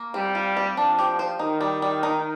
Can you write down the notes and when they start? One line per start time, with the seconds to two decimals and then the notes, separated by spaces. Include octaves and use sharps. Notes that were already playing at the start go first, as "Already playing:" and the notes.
Already playing: A#3
0.14 G3 C4
0.35 F4
0.57 C4
0.77 F3 D4
0.99 G4
1.19 C5
1.39 D#3 D#4
1.61 G3
1.82 G3
2.03 D#4